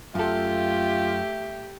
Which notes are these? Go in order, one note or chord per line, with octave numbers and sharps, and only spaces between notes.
F#2 A3 F4 G4 A4 E5